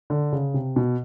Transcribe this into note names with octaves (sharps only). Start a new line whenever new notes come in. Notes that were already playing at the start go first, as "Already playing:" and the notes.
D3
C#3
C3
B2